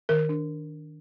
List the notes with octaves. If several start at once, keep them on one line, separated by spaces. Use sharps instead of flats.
D#3 A#4
D4